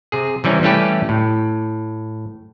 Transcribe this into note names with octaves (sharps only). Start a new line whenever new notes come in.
C3 G#4
C3 E3 G3 C#4
E3 G3 A3 C#4 G4 B4
A2